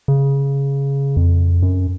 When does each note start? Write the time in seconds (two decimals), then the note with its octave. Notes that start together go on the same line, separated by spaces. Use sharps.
0.08 C#3
1.17 F2
1.63 F#2